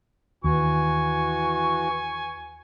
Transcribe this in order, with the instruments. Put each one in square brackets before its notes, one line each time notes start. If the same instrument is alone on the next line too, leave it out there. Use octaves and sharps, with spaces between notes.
[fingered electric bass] D#2 [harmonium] E3 F#4 [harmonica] G#5 C#6